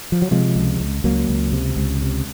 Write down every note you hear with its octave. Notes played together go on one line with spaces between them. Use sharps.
F3
F#3
C3 F3 G#3
C#2
C#2
C#2 F#3 A#3
C#2
C3
C#2
C3